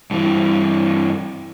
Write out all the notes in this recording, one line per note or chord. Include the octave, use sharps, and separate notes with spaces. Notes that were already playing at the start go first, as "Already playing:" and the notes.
G2 E3